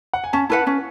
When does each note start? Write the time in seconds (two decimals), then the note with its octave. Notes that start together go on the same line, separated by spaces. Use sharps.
0.14 F#5
0.24 G#5
0.33 C#4 A5
0.50 E4 B4 F#5 A5
0.67 C#4